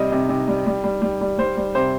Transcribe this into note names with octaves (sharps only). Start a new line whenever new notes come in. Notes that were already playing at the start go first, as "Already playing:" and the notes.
Already playing: C3 G3 D#5
C3
C3
G3
G3
G3
G3
G3
G3 C5
G3
C3 C5